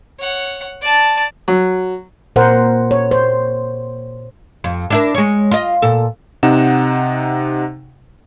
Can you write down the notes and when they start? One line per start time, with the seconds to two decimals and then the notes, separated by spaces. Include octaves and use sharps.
0.20 C#5 F#5
0.81 D5 A5
1.48 F#3
2.36 A#2 A#4 C5 F#5
2.91 C#5
3.11 C5
4.64 F2
4.90 D4 E4 A#4
5.15 G#3 C#5
5.51 F4 D#5
5.82 A#2 A4
6.43 C3 D#4 F#5 E7